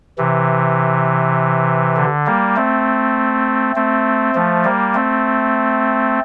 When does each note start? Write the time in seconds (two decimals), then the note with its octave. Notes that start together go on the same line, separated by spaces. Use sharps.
0.18 C3 E3
1.97 D3
2.26 G3 A#3
2.56 A3 C4
3.76 A3 C4
4.35 F3 A3
4.64 G3 A#3
4.94 A3 C4